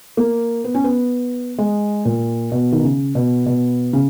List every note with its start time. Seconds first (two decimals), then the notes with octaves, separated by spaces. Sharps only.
0.17 A#3
0.64 B3
0.74 C#4
0.84 B3
1.58 G#3
2.05 A#2
2.52 B2
2.72 D#3
2.83 C#3
3.15 B2
3.46 B2
3.93 C#3